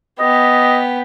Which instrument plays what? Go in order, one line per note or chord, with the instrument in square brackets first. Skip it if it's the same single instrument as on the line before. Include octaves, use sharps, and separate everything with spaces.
[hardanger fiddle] B3 G4 [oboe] D#5